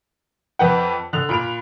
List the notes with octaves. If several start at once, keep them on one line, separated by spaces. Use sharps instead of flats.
F2 B4 F#5 G5
D3 F#6 F7
A#2 B5 D7 F7